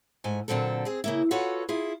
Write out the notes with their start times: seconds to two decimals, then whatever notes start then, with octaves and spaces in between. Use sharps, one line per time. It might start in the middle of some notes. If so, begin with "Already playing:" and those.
0.24 G#2 A3 G#5
0.48 A#2 D3 F#3 C4 A4
0.85 C4 G#4
1.04 C#3 A#3 E4
1.31 F4 F#4 A4 B4 C#5 F#5
1.69 E4 F4 G#4